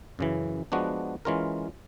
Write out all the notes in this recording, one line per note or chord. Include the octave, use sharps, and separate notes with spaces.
F#2 C#3 E3
F3 G#3 B3 D4 F#4
E3 G#3 C#4 F4 A#4